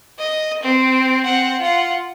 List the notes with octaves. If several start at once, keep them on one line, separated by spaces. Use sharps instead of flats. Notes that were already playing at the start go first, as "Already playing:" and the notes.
D#5
C4
C4 F#5
F4 F#5